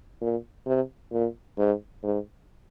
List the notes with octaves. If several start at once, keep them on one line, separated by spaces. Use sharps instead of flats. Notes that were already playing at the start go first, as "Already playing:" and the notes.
A#2
C3
A#2
G#2
G#2